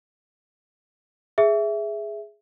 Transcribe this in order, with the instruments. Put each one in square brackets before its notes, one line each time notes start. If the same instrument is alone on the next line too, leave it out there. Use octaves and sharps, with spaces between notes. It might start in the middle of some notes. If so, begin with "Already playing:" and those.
[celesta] G#4 E5